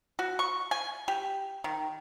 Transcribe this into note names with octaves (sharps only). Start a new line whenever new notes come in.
F#4
C#6
G#5
G4
D#3